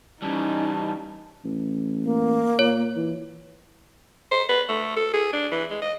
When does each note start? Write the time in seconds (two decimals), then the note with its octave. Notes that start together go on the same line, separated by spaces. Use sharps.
0.22 E3 G3 C#4 D#4 A5
1.44 A1
2.04 A#3
2.59 A#2 C#5
2.96 E3
4.31 C5
4.49 B4
4.69 A3
4.96 A4
5.13 G#4
5.33 D4
5.52 E3
5.70 G#3
5.82 D#5